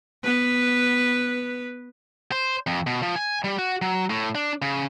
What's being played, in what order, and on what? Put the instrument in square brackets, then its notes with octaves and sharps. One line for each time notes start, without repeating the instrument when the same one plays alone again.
[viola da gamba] B3 B4
[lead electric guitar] C5
F2
B2
F3
G#5
G3
F#4
F#3
A2
D4
C#3